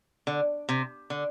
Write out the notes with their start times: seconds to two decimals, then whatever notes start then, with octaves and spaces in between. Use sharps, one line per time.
0.27 D3
0.69 C3
1.10 D3